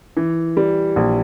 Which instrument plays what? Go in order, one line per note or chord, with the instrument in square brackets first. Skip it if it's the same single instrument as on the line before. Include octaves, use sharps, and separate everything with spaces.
[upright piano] E3
G3
A#1